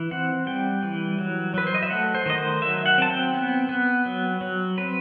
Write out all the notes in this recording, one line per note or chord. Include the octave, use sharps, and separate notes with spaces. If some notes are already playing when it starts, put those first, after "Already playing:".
Already playing: E3
C4 F#5
G3 G5
E3
F#3
F#3 B4
C5
D#5
E5
A3 F#5
C5
D#3 D#5
C5
F#3 E5
F#5
C4 A5
G5
B3
B3
F#3
F#3
C4 B4